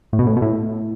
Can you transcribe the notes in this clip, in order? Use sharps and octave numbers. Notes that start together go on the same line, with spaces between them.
A2
B2
A2
B2
A2